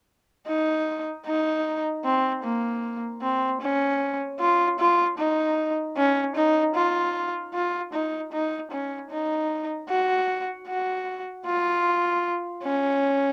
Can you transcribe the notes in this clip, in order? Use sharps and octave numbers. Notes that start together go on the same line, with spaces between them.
D#4
D#4
C4
A#3
C4
C#4
F4
F4
D#4
C#4
D#4
F4
F4
D#4
D#4
C#4
D#4
F#4
F#4
F4
C#4